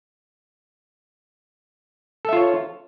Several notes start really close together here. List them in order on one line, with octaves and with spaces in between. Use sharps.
A4 E5 F4 C#5